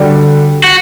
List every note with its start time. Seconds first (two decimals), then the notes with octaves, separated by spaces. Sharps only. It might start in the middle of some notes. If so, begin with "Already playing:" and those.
Already playing: D3 G3 D4 F#4
0.64 F#4